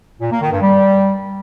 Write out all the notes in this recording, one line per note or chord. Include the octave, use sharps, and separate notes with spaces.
A#2
A#3
D#3
G2
G3